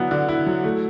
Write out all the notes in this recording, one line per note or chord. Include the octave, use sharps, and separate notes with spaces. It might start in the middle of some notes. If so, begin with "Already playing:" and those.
Already playing: D3 F#3 B3 E4
D3
E4
F#3
A3